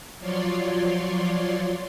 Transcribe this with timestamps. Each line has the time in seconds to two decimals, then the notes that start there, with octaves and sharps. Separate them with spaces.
0.20 F3 F#3 F4 C#5 D5 C6